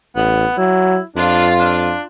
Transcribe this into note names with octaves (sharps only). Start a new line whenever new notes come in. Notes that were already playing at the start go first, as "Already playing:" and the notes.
A1 B3
F#3 E4
F2 D4 F4
D4